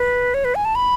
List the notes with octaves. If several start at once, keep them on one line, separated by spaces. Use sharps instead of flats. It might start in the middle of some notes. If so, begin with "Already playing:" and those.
Already playing: B4
C#5
B4
G#5
A5
B5